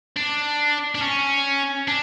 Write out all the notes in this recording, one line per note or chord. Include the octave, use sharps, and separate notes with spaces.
D4
D4
C#4
D4